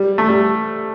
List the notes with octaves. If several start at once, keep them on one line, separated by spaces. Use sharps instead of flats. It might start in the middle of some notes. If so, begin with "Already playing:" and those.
Already playing: G3
A3
G3